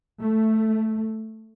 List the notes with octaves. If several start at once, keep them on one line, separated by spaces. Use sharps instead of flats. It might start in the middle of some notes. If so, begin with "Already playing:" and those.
A3